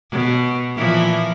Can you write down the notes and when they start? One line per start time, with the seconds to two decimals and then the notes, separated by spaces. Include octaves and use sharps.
0.11 B2
0.75 A#2 E3 F3